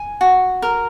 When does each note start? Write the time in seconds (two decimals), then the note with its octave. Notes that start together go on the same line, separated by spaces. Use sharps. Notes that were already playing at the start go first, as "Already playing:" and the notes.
Already playing: G#5
0.21 F#4
0.62 A#4